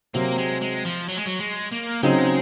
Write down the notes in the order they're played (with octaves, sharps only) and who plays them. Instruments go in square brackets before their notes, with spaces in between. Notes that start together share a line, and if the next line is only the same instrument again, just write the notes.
[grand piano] C3 F#3 C4 [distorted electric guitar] A#3
[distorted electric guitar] G#3
G#3
F3
F#3
G#3
F#3
G#3
A#3
[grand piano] C#3 F#3 C4 D#4 [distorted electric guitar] G#3